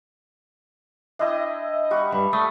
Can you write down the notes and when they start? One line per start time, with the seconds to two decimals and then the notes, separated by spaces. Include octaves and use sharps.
1.19 D4 E4 D#5 E5 G5
1.91 G3 F#5 C#6
2.12 G2 B5
2.33 A3 D#6